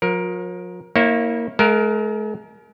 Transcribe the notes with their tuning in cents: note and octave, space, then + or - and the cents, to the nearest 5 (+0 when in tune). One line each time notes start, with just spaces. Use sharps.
F3 +45 A#4 +15
A#3 +0 E4 -30 C#5 -25
G#3 +45 A#4 +0 F5 +10